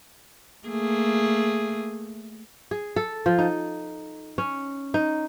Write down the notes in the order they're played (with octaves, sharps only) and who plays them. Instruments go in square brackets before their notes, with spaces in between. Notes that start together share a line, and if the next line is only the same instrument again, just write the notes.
[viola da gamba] A3 A#3 G#4
[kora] G#4
A4
F3
D#4
C#4
D#4